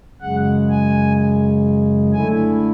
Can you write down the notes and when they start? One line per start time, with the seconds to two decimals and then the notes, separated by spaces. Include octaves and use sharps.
0.21 F#2 C#3 G#3 F#5
0.69 G#5
2.13 D3 A3 E4 G#5